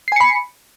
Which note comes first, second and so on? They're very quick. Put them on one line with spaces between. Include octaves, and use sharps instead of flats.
C7 G#5 C#7 B5